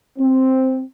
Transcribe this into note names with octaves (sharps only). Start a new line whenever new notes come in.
C4